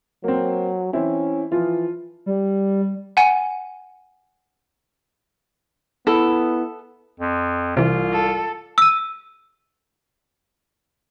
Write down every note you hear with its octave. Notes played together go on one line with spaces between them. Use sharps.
F#3 A#3 C4
E3 C4 C#4 E4
E3 F3 F4
G3
F#5 G#5
B3 E4 A4
F2
C2 C3 E3 F4
A4
E6 D#7